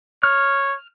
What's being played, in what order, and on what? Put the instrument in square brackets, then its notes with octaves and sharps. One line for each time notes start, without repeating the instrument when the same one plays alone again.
[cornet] C#5 [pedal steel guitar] F6